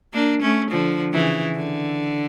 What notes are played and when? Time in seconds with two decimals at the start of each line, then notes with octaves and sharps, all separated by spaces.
0.14 A#3 D4
0.42 A3 C#4
0.71 D3 F3
1.13 C#3 E3
1.56 D3